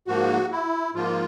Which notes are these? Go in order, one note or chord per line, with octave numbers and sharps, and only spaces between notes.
G#2 F3 A#3 F#4
E4
G#2 F3 A#3 F4